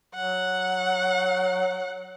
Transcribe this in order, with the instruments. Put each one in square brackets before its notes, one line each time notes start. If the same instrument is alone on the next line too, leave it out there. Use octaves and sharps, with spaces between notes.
[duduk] F#3 [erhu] F#5